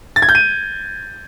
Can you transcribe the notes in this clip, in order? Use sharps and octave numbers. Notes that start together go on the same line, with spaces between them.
A6
G#6
G6
D#7